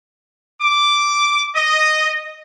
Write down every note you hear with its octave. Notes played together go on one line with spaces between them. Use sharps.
D6
D#5